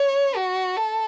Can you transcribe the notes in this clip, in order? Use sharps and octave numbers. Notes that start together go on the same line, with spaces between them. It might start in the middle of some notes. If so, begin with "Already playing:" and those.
Already playing: C#5
F#4
A4